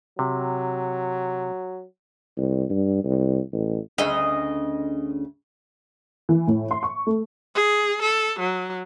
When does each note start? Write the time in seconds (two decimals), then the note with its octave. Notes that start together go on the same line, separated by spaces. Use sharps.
0.19 C3 F#3
2.37 C2
2.70 G2
3.04 C2
3.52 A1
3.98 D2 C#3 D#5 E5
6.29 E3
6.47 A2
6.71 C6
6.83 C#6
7.07 A3
7.55 G#4
8.02 A4
8.39 F#3